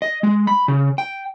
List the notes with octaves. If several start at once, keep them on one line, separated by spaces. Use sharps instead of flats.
D#5
G#3
B5
C#3
G5